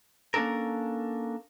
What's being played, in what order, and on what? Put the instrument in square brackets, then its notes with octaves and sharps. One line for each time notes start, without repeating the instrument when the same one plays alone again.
[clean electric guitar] A#3 C#4 D4 A4 A#4